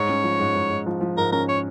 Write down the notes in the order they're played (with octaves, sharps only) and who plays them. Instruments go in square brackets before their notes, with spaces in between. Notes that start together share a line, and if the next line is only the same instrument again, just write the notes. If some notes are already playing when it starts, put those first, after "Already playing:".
Already playing: [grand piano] G#2 [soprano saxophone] C#5
[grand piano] C#4
F3
G#2
G#2
G#2
F3
F3
[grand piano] G#2 [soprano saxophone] A#4
[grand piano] C#4 [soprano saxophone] A#4
[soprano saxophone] C#5